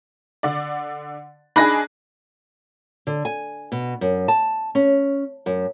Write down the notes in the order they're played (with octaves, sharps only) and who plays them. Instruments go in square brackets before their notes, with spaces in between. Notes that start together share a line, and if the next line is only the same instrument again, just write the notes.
[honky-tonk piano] D3 D5
[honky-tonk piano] D4 D#4 G#4 [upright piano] B5 F#6 A#6
[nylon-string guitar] D3
G#5
B2
F#2
A5
C#4
F#2